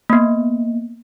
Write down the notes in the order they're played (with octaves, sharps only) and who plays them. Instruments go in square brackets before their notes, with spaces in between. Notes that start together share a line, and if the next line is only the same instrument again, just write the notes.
[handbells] A#3 B3